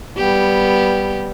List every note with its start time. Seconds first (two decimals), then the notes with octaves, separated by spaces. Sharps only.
0.18 G3 B3 G4